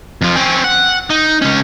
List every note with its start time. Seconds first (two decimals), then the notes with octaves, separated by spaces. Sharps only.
0.22 F2 F3
0.36 C4 C#4
0.64 F#5
1.10 D#4
1.42 C#2 C#4